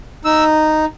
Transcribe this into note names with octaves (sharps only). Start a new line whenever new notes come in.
D#4 E6